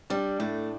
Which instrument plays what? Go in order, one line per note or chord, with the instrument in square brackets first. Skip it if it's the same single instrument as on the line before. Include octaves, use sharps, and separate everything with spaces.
[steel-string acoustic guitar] G3 [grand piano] D4
[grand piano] A2 [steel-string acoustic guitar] A3